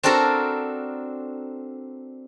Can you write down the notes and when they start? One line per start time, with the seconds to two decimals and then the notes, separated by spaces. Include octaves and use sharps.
0.03 C4 D4 F#4 A4 A#4